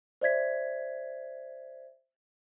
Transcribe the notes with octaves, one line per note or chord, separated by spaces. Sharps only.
C5 D5 E5 G#6 B6